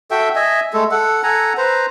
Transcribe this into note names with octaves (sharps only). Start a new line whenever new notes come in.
F#4 A4 E5 G5
D#5 E5 G#5
G#3 A3 A4
A4 F#5
A4 F#5 G#5 A#5
B4 C5 A#5